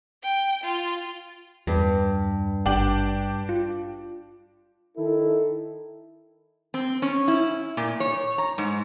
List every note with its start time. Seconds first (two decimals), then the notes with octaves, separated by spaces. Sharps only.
0.24 G5
0.63 F4
1.67 E2 G2
2.66 G#1 D4 G4 F#7
3.49 F4
4.97 D#3 E4 A4
6.74 C4
7.02 C#4
7.28 E4
7.77 A#2
8.00 C#5
8.38 A#5
8.58 G#2